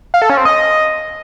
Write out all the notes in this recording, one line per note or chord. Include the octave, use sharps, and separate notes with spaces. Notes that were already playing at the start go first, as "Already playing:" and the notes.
F5
A4
C#4
C4
D#5